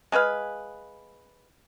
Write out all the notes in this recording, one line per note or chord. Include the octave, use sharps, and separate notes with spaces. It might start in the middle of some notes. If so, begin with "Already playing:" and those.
G#3 G#4 B4 F5